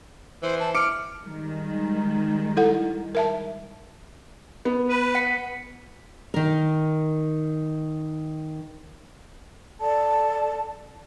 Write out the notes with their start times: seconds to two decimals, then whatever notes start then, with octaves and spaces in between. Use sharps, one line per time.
0.43 E3 C5
0.60 A5
0.75 D6 F6 C#7 D7
1.23 D#3 G3 G#3
2.57 E4 A4 F#5
3.15 A#4 E5 A5
4.65 B3
4.89 B4
5.15 F#5 B6 C#7
6.34 D#3 A#4
9.79 A4 D5 A5